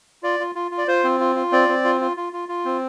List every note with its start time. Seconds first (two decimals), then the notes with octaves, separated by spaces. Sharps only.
0.23 F4 D5
0.40 F4
0.55 F4
0.71 F4
0.78 D5
0.88 F4 C5
1.04 C4
1.20 F4
1.36 F4
1.52 C4 D5
1.69 C4
1.85 F4
2.01 F4
2.17 F4
2.33 F4
2.49 F4
2.65 C4